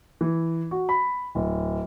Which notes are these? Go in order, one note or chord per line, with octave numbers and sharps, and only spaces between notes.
E3
F#4
B5
D1